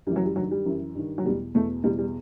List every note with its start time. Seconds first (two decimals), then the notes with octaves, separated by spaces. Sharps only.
0.06 F#2 G3
0.10 E3
0.16 F#3
0.26 G3
0.36 G2 D#3 F#3
0.51 G3
0.66 F#2 E3
0.95 G2 D#3
1.18 F#3
1.25 E2 B2 G3
1.55 E2 B2 A3
1.84 E2 B2 G3
1.99 G3